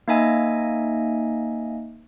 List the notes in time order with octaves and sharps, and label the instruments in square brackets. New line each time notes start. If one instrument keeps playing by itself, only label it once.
[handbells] A#3 D#4 D#5 E5 G#5